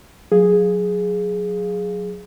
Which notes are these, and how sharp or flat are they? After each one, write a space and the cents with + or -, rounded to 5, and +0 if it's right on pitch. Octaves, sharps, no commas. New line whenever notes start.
F#3 -20 G#4 +0 F5 +0